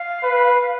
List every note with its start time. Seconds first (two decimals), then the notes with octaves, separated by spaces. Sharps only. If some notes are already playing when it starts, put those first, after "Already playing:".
Already playing: F5
0.23 B4